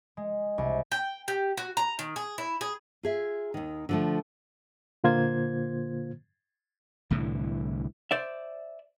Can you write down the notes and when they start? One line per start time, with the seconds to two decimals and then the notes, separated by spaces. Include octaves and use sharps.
0.17 G#3
0.58 C2
0.92 G5
1.28 G4
1.57 F#4
1.77 A#5
1.99 D#3
2.16 G#4
2.38 E4
2.61 G#4
3.03 F4 G#4 E5
3.54 D#2 D#3
3.89 D3 F3 A3
5.04 A#2 D3 A#3 F4 C5 G#6
7.10 C2 A2 D3 E3
8.11 C5 D5 E5